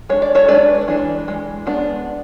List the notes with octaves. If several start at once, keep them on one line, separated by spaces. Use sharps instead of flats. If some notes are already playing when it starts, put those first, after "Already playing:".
G#3 D4 C#5
D5
A4 C#5
G#3 D4 B4 D5
E3 G#3 D4
E3 G#3
G#3 B3 D4